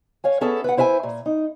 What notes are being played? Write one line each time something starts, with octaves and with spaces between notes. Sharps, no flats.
C#5 F5 G#5
B3 C#4 G#4 A4 E5
B4 F#5
E4 C5 E5 F5 G#5
A#2
D#4